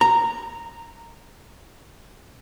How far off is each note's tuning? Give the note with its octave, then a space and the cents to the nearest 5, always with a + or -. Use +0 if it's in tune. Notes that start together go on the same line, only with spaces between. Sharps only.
A#5 -10